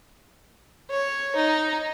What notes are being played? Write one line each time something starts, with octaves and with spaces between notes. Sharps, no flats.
C#5
D#4